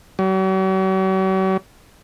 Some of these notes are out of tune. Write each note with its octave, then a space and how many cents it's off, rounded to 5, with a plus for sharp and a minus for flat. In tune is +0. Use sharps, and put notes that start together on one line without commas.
F#3 +45